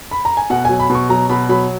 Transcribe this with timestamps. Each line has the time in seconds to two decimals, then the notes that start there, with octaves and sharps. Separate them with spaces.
0.11 B5
0.25 A#5
0.37 G#5
0.50 B2 F#5
0.65 F#3 G#5
0.80 B5
0.90 B2
0.95 C#6
1.09 F#3 A#5
1.29 B2 B5
1.49 F#3 B5